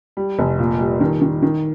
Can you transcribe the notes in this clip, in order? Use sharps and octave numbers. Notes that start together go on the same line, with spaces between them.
G3
F1
A#2
G3
D#3
D#3
D#3